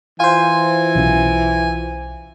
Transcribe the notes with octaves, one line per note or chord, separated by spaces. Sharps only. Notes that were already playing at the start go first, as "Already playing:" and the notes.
E3 F4 C5 G#5
B1 B2 C#4